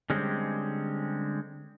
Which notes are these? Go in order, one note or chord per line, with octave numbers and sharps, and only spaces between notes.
D3 G3 G#3 C4 C#4